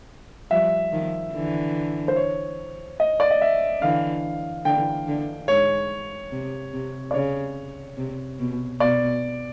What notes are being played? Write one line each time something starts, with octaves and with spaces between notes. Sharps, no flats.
F3 G3 E5
D#3 F3
D3 E3
C5
C#5
D#5
D5
D#5
E5
D3 E3 F5
D3 E3 G5
D3
G#2 C#5
C3
C3
D5
C#3 C#5
C3
B2
B2 D5